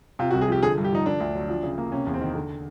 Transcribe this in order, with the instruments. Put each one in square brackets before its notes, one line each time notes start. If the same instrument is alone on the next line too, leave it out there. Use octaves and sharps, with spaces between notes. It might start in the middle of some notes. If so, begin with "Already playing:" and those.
[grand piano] C3 [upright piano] F4
[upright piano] F#4
[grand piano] C2
[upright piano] G#4
[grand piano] F3 [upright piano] G4
[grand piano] D3 [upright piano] G#4
[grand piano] G2
[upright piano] G4
[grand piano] F3 [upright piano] D#4
[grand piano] D3 [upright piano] D4
[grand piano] D2
F#3
F3
C#3
A#3
[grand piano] C3 [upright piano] C#4
[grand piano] E2
[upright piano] C4
[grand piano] D#3
D3